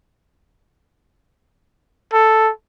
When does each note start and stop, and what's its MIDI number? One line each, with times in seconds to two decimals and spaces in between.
2.13 2.50 69